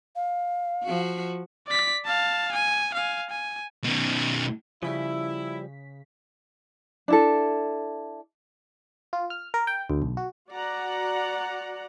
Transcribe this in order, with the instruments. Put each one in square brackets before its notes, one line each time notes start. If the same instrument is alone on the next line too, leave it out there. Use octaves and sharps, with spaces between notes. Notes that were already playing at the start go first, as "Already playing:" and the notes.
[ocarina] F5
[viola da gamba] F3 F#4
[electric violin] D5 B6
F5 A5
G#5
F5 G#5
G#5
[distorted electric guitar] B2 D#3
[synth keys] C#3 B6 [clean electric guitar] F3 G3 [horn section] E4
[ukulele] D4 E4 A4
[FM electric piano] F4
F6
A#4
G5
D2
B1
F#4
[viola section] F#4 D5 F#5 A#5